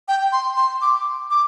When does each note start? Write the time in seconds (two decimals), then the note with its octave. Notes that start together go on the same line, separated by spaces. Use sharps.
0.08 G5
0.32 C6
0.57 C6
0.82 D6
1.31 D6